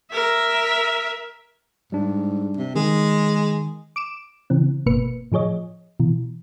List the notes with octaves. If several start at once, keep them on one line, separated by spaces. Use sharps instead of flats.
A#4 E5
G#2 G3 D4
C3
D#3 G#3
D6 D7 E7
C#3 E3 C4
G1 B2 A#3 B4 C#7
A2 F3 G#4 C#5 D#5
B2 E3